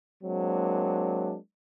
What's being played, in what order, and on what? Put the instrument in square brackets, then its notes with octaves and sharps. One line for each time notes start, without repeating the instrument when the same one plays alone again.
[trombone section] F#3 G#3 A#3 C4 D4